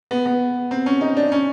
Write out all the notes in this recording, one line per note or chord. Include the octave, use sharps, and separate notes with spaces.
B3
B3
C4
C#4
D#4
D4
C#4